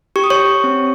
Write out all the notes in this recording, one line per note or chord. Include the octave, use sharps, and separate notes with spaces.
G4 C#6
D#6
C#5 C#6
G4
C4